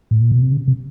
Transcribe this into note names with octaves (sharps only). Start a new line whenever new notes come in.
A2
A#2
B2
C3
C#3
C3